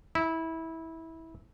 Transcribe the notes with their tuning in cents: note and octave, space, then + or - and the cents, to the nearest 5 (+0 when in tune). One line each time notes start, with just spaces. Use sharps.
E4 -20